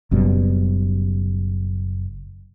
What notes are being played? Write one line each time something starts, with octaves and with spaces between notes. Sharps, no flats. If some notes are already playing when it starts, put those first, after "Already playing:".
F#1 F#2 B2 G3